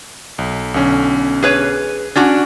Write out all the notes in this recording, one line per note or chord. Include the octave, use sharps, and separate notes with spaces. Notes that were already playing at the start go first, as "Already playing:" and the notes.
B1
B1 D3 C#4
G#4 B4 C#5
C#4 D4 F#4 A6